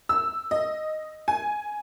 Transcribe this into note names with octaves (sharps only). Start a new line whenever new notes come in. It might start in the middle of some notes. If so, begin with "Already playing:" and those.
E6
D#5
G#5